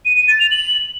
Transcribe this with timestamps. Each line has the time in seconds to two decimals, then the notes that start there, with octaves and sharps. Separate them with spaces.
0.05 D#7
0.17 D#7
0.28 A6
0.40 F7
0.51 F#7